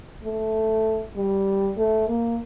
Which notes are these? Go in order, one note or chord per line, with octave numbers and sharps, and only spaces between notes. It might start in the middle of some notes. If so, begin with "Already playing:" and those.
A3
G3
A3
A#3